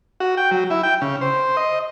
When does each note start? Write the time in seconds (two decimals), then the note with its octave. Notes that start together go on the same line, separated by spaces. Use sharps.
0.20 F#4
0.37 G5
0.51 F#3
0.70 E4
0.83 G5
1.02 C#3
1.21 C5
1.57 D#5